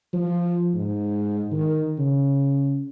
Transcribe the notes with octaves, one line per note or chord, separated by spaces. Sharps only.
F3
G#2
D#3
C#3